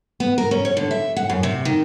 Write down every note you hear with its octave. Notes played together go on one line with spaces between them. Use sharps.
B3
A#4
C#4
C#5
D3
E5
F#5
F#2
C3
D#3